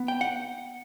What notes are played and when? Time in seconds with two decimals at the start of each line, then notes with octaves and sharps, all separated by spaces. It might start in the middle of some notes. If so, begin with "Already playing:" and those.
Already playing: B3
0.08 G5
0.21 F#5